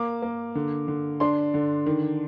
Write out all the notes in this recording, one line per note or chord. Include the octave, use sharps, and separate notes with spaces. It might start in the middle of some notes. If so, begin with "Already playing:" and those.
Already playing: A#3 D6
A#3
D3
D3
D4 C6
D3
D#3